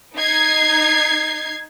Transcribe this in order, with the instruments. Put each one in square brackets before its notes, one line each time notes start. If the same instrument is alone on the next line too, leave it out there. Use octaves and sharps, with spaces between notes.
[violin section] D#4 G#6 C7